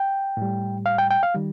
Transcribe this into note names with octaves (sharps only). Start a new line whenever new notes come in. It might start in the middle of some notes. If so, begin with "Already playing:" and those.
Already playing: G5
A2 G3
F5
G5
G5
F5
D#3 G3